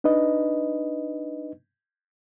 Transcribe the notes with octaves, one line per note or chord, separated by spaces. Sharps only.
D4 D#4 B4 D#5